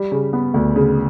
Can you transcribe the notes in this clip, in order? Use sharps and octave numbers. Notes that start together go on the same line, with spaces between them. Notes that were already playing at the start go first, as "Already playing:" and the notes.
Already playing: G3
C#3
B3
D2
C#3